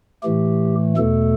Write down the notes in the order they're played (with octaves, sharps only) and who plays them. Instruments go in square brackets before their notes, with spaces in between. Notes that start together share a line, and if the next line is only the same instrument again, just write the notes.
[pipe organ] A2 E3 A3 G4
E2 B2 A3 A4